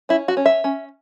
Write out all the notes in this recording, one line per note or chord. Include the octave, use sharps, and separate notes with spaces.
C#4 E4
F#4
C#4
E5
C#4